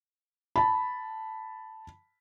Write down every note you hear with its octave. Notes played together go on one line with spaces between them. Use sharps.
A5 B5